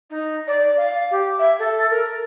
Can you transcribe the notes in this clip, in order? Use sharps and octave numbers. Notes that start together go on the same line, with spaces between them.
D#4
D5
F5
G4
E5
A4
A#4